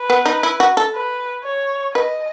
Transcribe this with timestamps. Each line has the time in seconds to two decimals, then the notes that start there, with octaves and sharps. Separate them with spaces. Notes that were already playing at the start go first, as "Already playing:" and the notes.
Already playing: B4
0.10 B3
0.26 D#4
0.43 E4
0.60 F#4
0.77 A4
0.94 B4
1.44 C#5
1.95 B4 D#5